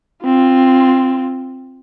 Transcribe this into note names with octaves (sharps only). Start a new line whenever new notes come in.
C4 F4